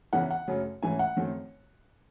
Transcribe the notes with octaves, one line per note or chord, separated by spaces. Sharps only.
E2 C#3 E3 F#5
F#5
F#2 C#3 F#3 A3 C#4
G#2 E3 A3 C#4 G#5
F#5
F#2 D#3 A3 C4